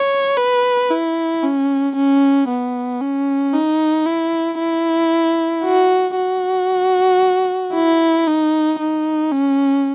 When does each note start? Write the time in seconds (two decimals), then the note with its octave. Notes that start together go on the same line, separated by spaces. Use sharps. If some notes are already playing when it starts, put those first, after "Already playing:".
Already playing: C#5
0.38 B4
0.91 E4
1.43 C#4
1.96 C#4
2.49 B3
3.01 C#4
3.54 D#4
4.06 E4
4.59 E4
5.64 F#4
6.16 F#4
7.74 E4
8.27 D#4
8.79 D#4
9.32 C#4